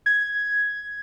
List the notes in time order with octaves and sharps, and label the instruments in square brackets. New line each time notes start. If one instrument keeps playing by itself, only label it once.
[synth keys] G#6